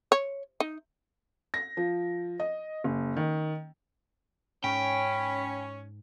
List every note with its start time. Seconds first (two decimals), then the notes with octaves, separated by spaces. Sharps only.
0.12 C#5
0.60 D#4
1.54 A#6
1.77 F3
2.40 D#5
2.84 F#1
3.16 D#3
4.64 G#2 C#4 G5 B5